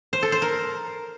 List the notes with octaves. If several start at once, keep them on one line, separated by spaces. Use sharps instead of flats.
C5
A4
C5
A#4